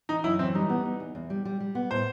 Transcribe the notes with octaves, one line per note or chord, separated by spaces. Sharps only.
E3 D#4
F#2 E4
E3 C4
G3 D#4
B3
B3
E2
E2
G3
G3
G3
B3
A2 C5